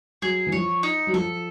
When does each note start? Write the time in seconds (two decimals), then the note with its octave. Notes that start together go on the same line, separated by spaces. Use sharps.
0.22 F#3 G#4
0.47 E3
0.52 F3 C#5
0.83 D#4
1.07 F#3
1.13 F3 A4